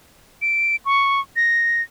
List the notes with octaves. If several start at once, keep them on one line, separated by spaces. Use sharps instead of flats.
D7
C#6
A#6